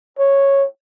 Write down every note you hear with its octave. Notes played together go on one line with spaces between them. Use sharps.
C#5